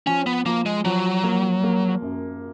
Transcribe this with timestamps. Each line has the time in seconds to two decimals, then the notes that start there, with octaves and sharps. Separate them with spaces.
0.07 F3 C#4
0.26 B3
0.45 F3 A#3
0.66 G#3
0.85 F3 F#3
1.23 A#3
1.63 A#3
2.02 F#2